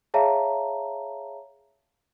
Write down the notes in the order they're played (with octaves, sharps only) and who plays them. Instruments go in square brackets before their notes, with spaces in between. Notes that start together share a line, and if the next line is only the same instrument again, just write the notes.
[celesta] G#4 C#5 E5 F5 A5 A#5